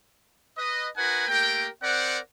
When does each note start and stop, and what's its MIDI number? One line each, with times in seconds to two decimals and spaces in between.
0.57 0.87 71
0.57 0.87 75
0.97 1.26 63
0.97 1.26 66
0.97 1.26 70
0.97 1.26 71
0.97 1.26 78
0.97 1.26 80
1.28 1.67 57
1.28 1.67 58
1.28 1.67 67
1.28 1.67 70
1.28 1.67 79
1.82 2.18 60
1.82 2.18 70
1.82 2.18 72
1.82 2.18 74
1.82 2.18 78